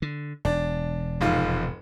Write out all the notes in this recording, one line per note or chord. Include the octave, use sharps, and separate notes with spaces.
D3
E1 D4
F1 G#2 F4